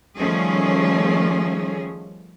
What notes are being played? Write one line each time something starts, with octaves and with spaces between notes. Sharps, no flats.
D#3 F3 G3 A3 C#4 G#4